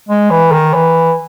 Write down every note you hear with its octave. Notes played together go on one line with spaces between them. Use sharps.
G#3
E3
D#3
E3